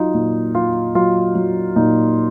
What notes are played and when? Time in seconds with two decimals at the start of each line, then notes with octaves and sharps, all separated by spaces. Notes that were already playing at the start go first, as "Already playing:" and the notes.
Already playing: F#3 D#4 F4
0.14 A#2
0.55 F#3 F4
0.95 F#3 F4
1.35 F#3
1.76 A#2 D#4